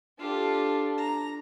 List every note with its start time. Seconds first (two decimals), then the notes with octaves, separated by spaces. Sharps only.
0.19 D4 F4 G4 A4
0.98 A#5